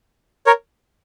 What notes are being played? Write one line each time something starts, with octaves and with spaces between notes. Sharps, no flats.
A#4 C#5